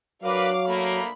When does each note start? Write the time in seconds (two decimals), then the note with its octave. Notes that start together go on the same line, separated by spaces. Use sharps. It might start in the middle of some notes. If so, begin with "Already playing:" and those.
0.23 F#3 D4 A#4 B4 F5 D6
0.67 D2 A3 A#3 B5